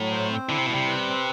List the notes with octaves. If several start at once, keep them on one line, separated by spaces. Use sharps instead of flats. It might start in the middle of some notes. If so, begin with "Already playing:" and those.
Already playing: A2 F#3
C5
C4
D3 E4
C3
B2 G3
C3
B4
C4